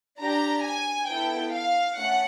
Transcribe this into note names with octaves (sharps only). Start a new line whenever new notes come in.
D4 G4 A#5
G#5
B3 E4 A4 G5
F5
A3 C#4 F#5